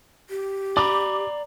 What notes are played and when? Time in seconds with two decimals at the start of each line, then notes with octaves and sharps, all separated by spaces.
0.30 G4
0.77 D5 A#5 B5 D6